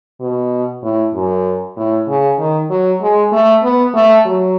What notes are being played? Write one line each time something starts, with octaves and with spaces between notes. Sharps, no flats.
B2
A2
F#2
A2
C#3
D#3
F#3
G#3
A3
B3
A3
F#3